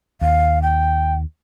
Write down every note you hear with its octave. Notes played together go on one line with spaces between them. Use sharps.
D#2 F5
G5